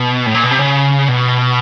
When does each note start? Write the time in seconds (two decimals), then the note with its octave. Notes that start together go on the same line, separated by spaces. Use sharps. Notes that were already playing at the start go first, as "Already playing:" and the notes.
Already playing: B2
0.26 A2
0.34 A#2
0.43 B2
0.51 C3
0.59 C#3
1.08 B2